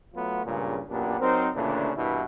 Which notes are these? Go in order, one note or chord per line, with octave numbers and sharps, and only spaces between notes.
F#3 A3 B3 F4
C#2 G2 A#2 C#3
F#2 A#2 B3 D4 G4
F#3 C4 D#4 A#4 C5
D2 A#2 C#3 E3 D4
C2 G2 B2 E3 E4